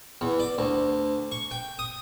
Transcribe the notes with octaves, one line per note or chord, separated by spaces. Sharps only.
E2
D5
D2
C#6
G5
D#6